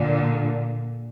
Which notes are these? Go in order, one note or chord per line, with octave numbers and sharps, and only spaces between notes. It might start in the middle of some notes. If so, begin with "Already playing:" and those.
Already playing: A#2 D3